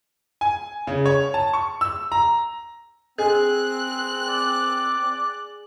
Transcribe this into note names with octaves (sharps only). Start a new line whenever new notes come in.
G#5
C#3
C#5
A5
C#6
E6
A#5
C4 G#4 F#6
D5